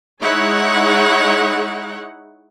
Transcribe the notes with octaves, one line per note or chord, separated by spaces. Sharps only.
G#3 D#4 E4 G#4 C#5 F#5